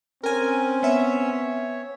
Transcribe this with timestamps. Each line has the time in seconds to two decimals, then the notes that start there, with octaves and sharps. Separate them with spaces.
0.23 C4 C#4 A#4 G#5
0.83 B3 C#5 E5